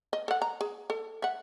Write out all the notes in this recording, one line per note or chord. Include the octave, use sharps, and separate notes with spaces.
D#5
A4 F#5
A#5
G#4
A4
E5 F#5